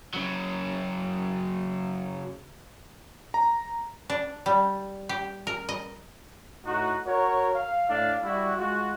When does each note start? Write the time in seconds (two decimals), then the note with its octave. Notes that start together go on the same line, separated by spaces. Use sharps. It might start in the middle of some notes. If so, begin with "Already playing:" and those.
0.14 C#3 F#3
3.34 A#5
4.10 D4
4.46 G3
5.09 G4
5.47 A#4
5.69 D#5
6.65 A2 D#4 F#4
7.06 F#4 A#4 C#5
7.53 F5
7.89 A2 D4 F5
8.23 G3 E4 F#4
8.57 G#3 F4 F#4